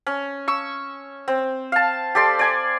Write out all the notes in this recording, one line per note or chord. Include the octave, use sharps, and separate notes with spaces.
C#4
C#6 E6
C4
F5 A5
G4 A4 D5 C6
D5 G#5